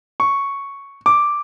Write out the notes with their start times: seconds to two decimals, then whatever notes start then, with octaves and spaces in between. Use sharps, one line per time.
0.20 C#6
1.06 D6